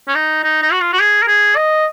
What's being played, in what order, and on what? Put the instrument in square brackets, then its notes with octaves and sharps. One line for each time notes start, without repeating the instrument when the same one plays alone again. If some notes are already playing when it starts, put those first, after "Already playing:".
[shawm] C#4
D#4
D#4
D#4
F#4
F4
F#4
G#4
A#4
G#4
D#5